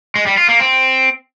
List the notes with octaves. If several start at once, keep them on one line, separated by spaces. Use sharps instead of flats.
G#3
G3
F4
A#3
C4